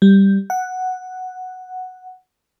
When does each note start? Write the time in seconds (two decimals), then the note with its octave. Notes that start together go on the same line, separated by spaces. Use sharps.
0.02 G3
0.50 F#5